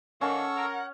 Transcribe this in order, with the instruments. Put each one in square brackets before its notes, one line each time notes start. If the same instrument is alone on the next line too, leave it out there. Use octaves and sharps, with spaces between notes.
[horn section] D#3 A#3 D4 [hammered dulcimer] C#4 [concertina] A4 C#6 E6 [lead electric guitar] F#5
[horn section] A#4